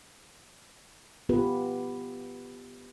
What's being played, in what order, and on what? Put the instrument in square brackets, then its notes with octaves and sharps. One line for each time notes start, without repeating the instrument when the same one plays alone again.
[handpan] B3 F4 G4 B4